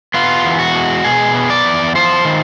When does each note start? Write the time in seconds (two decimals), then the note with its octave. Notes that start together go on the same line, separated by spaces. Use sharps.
0.14 B3 F4
0.45 E2
0.59 F#4
0.75 G#3
1.04 B2 G#4
1.35 B3
1.50 D5
1.66 E2
1.95 F4 C5
2.25 D#3